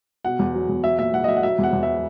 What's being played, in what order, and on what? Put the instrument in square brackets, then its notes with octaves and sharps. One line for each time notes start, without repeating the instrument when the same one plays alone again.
[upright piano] B2 F#5
E2
F#3
E2
F#3 E5
A#2 E5
A#2 F#5
D#5
F#3 E5
F#5
F#3 E5
E2 F#5
E2
E5